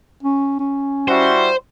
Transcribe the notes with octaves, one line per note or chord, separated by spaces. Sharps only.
C#4
C#4
G3 E4 F#4 C5